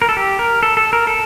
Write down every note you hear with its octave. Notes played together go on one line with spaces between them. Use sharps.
A#4
A4
G4
A#4
A4
A4
A#4
A4